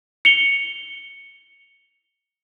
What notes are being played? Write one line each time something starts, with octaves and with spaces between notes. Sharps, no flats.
C#7 F7 G7